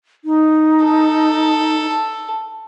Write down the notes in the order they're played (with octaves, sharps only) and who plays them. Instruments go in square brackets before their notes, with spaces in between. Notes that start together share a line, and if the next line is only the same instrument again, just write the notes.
[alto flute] D#4
[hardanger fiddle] A4